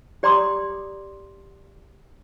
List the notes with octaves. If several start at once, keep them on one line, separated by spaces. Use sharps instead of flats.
G4 D5 A#5 C6 D6 D#6